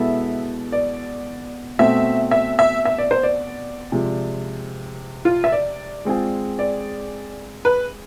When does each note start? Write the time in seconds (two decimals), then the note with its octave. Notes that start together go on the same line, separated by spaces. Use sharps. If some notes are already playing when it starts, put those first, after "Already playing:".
Already playing: B2 G#3 B3 E4 A4 E5
0.72 D5
1.79 B2 A3 C4 E5
2.31 E5
2.59 E5
2.85 E5
2.98 D5
3.11 C5
3.23 D5
3.92 C3 F3 G#3
5.25 F4
5.44 E5
5.52 D5
6.05 G#3 C4 F4 G#4
6.59 D5
7.65 B4